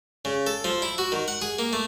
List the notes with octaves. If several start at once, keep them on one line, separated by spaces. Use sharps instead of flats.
C#3
A4
F3
E4
F#4
D#3
F#5
G#4
A#3
A3